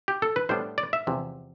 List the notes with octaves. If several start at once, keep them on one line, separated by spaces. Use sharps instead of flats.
G4
A4
B4
A2 G3 B3 D4 C5
D5
E5
E2 C3 F3